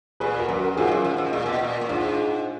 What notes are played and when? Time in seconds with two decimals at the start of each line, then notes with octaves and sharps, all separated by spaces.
0.20 A#2 G#4 B4
0.39 F#4 A#4
0.49 F#2
0.58 F#4 A#4
0.76 G#2 F4 G#4
0.91 F#2
1.04 G#2
1.18 G#2
1.33 A#2
1.46 B2
1.59 A#2
1.81 A#2
1.89 G#2 D4 F4